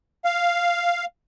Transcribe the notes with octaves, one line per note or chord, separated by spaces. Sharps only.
F5